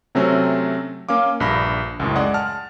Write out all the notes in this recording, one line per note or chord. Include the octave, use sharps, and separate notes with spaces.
C3 F#3 A3 C4 C#4
A#3 C#4 F5 D6
A#1 G2 B5 A#6
C#2 F#2 A2
G#3 G#4 D5 F#5
A5 F6